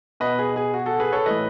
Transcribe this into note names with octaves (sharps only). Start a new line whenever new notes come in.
B2 B4 D#5
G#4
G#4
F#4
F#4 A4
G#4 B4
A4 C#5
A2 E3 B4 D#5